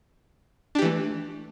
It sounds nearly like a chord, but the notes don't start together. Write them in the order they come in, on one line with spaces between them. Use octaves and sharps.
D4 G4 E3 A3